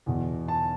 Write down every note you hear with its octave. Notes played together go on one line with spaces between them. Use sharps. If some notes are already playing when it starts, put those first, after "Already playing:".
E2 B2
A5